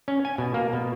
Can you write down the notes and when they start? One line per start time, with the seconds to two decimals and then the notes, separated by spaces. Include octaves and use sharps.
0.08 C#4
0.25 G#5
0.38 B2
0.54 A#3
0.73 B2